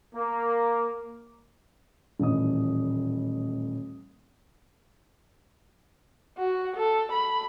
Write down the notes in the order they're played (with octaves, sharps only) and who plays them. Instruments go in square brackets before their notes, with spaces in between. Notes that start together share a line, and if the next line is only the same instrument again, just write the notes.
[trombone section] A#3
[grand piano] D#1 A2 E3 D#5 D#6
[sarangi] F#4
A4
B5